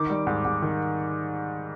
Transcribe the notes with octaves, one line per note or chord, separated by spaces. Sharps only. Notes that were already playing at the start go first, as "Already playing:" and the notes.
Already playing: D#3 D6
G3
G#2
G#2
D#3